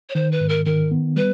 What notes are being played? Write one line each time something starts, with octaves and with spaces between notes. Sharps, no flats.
C#5
D#3 C5
B4
G#2
A#4
D#3 A#4
B3
G3 B4